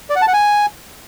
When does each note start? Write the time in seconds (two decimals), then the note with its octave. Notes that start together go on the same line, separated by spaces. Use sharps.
0.10 D5
0.16 F#5
0.22 A5
0.28 F#5
0.33 G#5